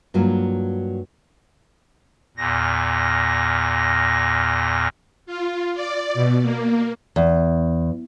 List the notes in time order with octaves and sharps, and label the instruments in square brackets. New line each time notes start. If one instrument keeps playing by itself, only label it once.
[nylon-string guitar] G2 F#3 A#3 F4
[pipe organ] E2 A#2 A#6
[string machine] F4
D5
B2
A#3
[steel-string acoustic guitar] E2